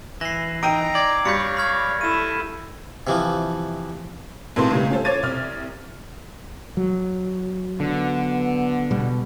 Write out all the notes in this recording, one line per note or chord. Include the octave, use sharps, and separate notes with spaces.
E3 A#6 C7
D#4 G5 A#5 E6 A#6 D7 D#7
D5 G#6
G2 C#5 F5 G6 B6 C#7
B5 F6 G#6
E4 A4 D#7 E7
C3 E3 F3
B1 A2 C3 B3 A5 C6
C#2 A2 C#3 G3
C#4 F4 A4 C5
C5 C#5 D6 G#6 A6 D#7
C2 F6
F#3
D3 B3
B2 G3